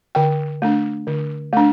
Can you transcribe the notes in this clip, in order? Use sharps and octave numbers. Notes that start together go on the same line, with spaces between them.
D3 G5
A3 D4
D3
A3 D4